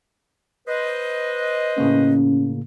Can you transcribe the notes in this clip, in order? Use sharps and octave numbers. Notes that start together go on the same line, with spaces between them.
B4 C5 D#5
A2 C#3 A#3 C#4